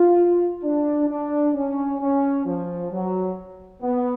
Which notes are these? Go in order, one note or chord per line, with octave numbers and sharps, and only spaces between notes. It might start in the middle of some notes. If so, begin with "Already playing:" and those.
Already playing: F4
D4
D4
C#4
C#4
F3
F#3
B3